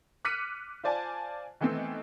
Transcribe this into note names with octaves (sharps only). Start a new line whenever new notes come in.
D6 F6 F#6 B6 C#7 D#7
F4 C5 D5 G#5 A5
D#3 E3 A3 B3 C4